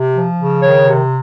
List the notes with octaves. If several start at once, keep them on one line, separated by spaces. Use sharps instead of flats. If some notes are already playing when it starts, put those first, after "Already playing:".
Already playing: C3
F3
C#3
D#3 C#5
C3